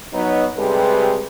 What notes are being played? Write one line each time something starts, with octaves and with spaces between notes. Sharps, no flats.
F#3 B3 D#4
C3 G3 G#3 G#4 A4 B4